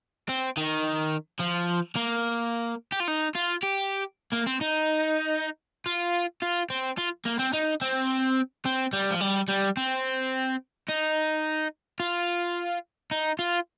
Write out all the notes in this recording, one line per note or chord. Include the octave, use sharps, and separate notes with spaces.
C4
D#3
F3
A#3
G4
F4
D#4
F4
G4
A#3
C4
D#4
F4
F4
C4
F4
A#3
C4
D#4
C4
C4
G3
F3
G3
G3
C4
D#4
F4
D#4
F4